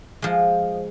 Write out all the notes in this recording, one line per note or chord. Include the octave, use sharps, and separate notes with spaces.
F3 G#3